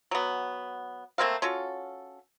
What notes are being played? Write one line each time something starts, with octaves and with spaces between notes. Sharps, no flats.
F#3 B3
A3 A#3 C4 F5
C#4 F4 F#4 A4